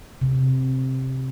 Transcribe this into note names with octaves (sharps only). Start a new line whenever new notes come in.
C3